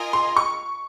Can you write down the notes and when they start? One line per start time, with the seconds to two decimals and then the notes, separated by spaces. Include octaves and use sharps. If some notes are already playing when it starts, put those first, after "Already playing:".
Already playing: F4 A#4 D#5 G#5
0.13 C6
0.37 C#6